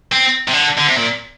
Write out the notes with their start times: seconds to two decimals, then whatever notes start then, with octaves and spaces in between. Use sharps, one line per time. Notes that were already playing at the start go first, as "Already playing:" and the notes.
0.12 C4
0.48 C3
0.54 D3
0.78 D3
0.87 C3
0.97 A#2